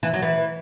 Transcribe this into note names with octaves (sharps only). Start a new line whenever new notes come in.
E3
F#3
E3